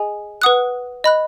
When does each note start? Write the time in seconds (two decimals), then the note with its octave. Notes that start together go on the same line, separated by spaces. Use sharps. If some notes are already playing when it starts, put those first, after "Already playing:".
Already playing: G#4 D#5 G#5
0.42 B4 F#5 D#6 F#6
1.04 D#5 B5 F#6